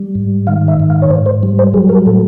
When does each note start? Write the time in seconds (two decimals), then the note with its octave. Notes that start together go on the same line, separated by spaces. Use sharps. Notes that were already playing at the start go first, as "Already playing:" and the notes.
Already playing: G3
0.15 G#2
0.47 D#3 F5
0.68 E5
0.80 G#2
0.90 F5
1.02 C#5
1.10 G#2 C5
1.26 C5
1.43 G3
1.59 C5
1.73 F#3 G#4
1.89 A#4
2.06 A2 A4